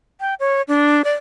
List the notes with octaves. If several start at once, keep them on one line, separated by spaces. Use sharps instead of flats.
G5
C#5
D4
D5